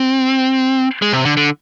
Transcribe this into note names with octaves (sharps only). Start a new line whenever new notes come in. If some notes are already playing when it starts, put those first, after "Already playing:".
Already playing: C4
G#3
C3
D3
D3